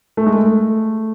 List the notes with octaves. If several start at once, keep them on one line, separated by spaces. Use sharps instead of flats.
A3
G#3
A3